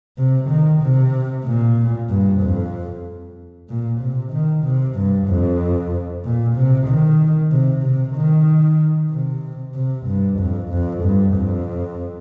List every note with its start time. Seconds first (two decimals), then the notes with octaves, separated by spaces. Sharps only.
0.18 C3
0.49 D#3
0.81 C3
1.45 A#2
2.10 G2
2.40 F2
3.69 A#2
4.01 C3
4.32 D#3
4.65 C3
4.96 G2
5.28 F2
6.24 A#2
6.56 C3
6.87 D#3
7.51 C3
7.84 C3
8.16 D#3
9.11 C3
9.75 C3
10.07 G2
10.40 F2
10.71 F2
11.03 G2
11.34 F2